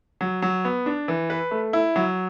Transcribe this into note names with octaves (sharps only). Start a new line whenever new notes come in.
F#3
F#3
B3
D4
E3
B4
A3
E4
F#3